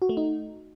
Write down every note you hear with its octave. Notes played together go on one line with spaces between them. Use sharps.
F#4
A3
D#4